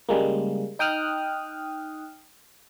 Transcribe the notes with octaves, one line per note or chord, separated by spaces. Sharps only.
C#3 G3 G#3 A#3
D#4 G5 D#6 F6 F#6